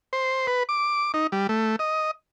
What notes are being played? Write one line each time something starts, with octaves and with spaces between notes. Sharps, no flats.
C5
B4
D6
D#4
G3
A3
D#5